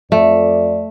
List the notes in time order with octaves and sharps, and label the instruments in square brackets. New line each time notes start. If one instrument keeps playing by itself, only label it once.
[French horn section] F2 D5 [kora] A3